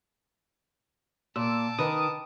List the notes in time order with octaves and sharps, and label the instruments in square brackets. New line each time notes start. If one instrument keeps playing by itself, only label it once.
[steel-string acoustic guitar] A#2 [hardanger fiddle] A5 D6 [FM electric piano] E6
[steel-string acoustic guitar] D#3 [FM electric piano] B4 D#6